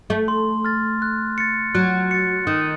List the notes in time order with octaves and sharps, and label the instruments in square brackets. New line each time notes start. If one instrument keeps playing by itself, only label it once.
[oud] A3
[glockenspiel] C6
F6 A6
F#6
A6 C#7
[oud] F#3 [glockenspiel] F#6
[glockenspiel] A6 C#7
[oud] D#3 [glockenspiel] D#6